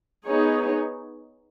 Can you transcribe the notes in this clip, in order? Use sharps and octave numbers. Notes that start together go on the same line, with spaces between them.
B3 D#4 G#4 C#5